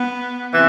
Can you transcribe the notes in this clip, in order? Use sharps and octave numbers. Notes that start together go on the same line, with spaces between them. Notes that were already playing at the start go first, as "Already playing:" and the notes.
Already playing: B3
C3 E3